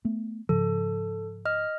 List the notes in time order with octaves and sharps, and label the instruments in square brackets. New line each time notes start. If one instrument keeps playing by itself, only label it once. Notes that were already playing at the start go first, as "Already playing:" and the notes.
[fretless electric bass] A3 B3
[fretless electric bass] G#2 C#3 F3 [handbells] A4
[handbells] D#5 F6